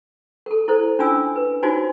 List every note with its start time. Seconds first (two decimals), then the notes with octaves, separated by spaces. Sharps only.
0.46 A4 A#4
0.68 E4 A4 C5
0.99 C#4 D4 F4 G#5 E6
1.36 B4
1.63 D#4 F4 F#4 C5 C#5 G#5